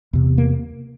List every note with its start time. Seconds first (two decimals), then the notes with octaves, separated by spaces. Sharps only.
0.13 E2 C3
0.38 A#3